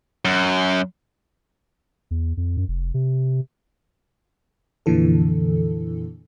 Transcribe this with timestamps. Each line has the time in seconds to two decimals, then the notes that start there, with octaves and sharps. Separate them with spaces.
0.25 F#2
2.11 E2
2.37 F2
2.57 F#2
2.68 F1
2.94 C3
4.86 F2 A#2 D3 E3 A4